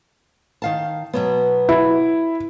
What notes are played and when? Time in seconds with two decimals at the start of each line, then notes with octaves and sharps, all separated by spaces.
0.62 D#3 F5 A5
1.13 B2 F#3 B3
1.69 E4